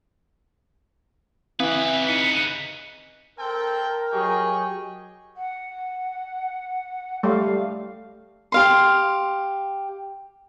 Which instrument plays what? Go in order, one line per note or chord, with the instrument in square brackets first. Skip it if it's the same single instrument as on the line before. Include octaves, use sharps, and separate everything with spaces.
[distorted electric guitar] C#3 B4 [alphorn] E3 [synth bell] C4
[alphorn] D#4 [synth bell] B6 C#7 D#7
[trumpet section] C4 A4 G5 [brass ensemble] A#4
[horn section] F#3 G4 G#4 [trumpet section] D#5 G5 C#6
[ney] F#5
[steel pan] G3 A3 [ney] F5
[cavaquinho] G4 F5 C6